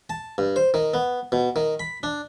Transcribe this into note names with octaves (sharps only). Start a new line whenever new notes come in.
A5
G2
C5
D#3
B3
B2
D#3
B5
D4